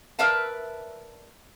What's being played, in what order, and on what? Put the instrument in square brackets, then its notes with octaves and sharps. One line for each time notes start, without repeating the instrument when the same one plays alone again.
[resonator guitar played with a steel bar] A#4 B4 D5 E5 F5 A5